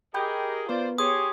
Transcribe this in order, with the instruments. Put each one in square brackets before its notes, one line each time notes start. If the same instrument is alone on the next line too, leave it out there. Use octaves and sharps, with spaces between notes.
[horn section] G4 G#4 D#5 [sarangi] A#4 [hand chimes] G5 B5 G6
[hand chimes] B3 B4 [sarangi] F4 [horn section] C5 D5
[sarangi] G4 [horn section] G#4 C#5 [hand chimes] C6 [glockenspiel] D#6